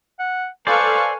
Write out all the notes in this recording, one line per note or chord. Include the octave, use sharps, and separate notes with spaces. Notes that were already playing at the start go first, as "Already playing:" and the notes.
F#5
A4 B4 C5 D5 F5 G#5 C#6